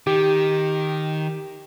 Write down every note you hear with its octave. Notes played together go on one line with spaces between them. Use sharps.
D#3 G4